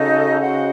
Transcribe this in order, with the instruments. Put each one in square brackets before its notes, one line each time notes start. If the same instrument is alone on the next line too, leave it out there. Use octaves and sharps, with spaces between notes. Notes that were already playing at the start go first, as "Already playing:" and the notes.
Already playing: [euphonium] C#3 [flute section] D#4 F#4 A4 D#5
[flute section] F#4 C5 D#5 F#5